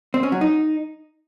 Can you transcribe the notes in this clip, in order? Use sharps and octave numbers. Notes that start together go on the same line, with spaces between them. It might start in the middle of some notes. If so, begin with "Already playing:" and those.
C4
C#4
F#3
D#4